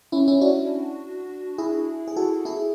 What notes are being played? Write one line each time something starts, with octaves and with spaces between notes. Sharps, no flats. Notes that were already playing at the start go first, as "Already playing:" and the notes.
C#4 E4
C#4 E4
D4 F#4
E4 G#4
G#4
F#4 A4
E4 G#4